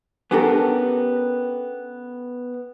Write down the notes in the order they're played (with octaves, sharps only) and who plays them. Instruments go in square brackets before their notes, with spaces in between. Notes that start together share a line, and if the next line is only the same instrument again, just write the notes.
[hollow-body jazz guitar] B3 C#4 D4 G4 A4 A#4